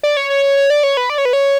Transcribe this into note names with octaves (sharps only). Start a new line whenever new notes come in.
D5
C#5
C#5
C#5
C#5
D5
C#5
B4
D5
C#5
B4
C#5